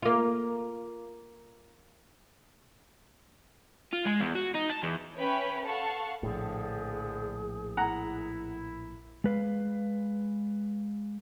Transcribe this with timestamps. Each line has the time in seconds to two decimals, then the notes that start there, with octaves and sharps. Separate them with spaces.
0.02 A#3 F4
3.93 F4
4.06 G#3
4.21 E2
4.35 F#4
4.54 D#4
4.70 A5
4.83 E2
5.18 C#4 B4 C#5 E5 G5 B5
5.64 A4 F5 F#5 A5 C#6
6.23 A#1 A2 D3 F3 G#4
7.77 E4 F#5 A#5
9.24 G#3 B4 F5